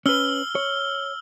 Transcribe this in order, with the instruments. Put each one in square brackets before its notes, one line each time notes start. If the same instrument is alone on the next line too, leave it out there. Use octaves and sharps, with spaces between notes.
[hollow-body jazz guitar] C#4 B4 [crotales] E6 F6 G7
[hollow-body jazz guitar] C#5